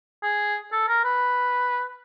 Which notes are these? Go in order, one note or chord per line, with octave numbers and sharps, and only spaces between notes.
G#4
A4
A#4
B4